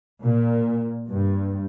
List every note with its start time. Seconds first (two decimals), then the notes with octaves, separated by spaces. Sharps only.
0.23 A#2
1.08 G2